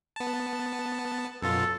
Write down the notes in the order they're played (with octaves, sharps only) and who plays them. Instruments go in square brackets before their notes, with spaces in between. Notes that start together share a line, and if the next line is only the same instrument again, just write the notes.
[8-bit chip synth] B3 A5
[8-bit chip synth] F#2 B2 F4 [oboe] A4